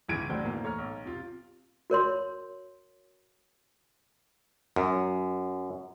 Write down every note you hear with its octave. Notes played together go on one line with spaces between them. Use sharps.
G1 C#2 E3 G#6 D7 D#7
C2 A2 D3 F#3 C5 G6
B1 E3 A#3
A3 C#5 A#5 F6
B1
C3 F4
F#4 A#4 C#5 C6
F#2